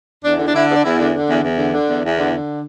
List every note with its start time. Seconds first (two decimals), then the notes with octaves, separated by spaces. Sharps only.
0.24 E2 D4
0.39 D3
0.47 D4
0.54 D3 E4
0.69 E2
0.75 D4
0.84 E2 E4
0.98 D3
1.13 D3
1.28 E2
1.43 E2
1.58 D3
1.72 D3
1.88 E2
2.02 E2
2.18 D3
2.33 D3